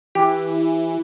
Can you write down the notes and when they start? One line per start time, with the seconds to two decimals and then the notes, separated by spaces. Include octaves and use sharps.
0.15 E3 G4